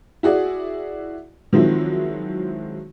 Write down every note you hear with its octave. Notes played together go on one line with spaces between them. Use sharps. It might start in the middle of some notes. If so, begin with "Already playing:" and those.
E4 F#4 G#4 D5
D#3 F3 F#3 G#3 C4 E4